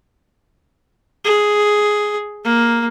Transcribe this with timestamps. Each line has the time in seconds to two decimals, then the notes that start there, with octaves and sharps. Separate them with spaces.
1.24 G#4
2.44 A#3